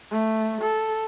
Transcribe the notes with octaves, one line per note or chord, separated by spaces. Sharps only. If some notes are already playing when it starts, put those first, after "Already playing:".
A3
A4